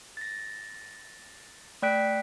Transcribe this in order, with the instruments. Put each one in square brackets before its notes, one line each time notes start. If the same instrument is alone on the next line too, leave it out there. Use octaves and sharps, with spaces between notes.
[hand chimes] A6 A#6
A3 D5 G5 F#6 B6 D7